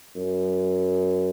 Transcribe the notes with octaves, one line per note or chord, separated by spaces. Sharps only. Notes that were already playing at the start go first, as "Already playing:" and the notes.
F#2